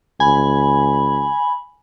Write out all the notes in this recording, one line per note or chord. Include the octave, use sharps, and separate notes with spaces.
C#2 G#5 B5